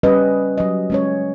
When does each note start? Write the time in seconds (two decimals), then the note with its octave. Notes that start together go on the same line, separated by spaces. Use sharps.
0.03 G3 C#4 G4 B4 D#5
0.58 F#3 D#5
0.90 G#3 C#4 C#5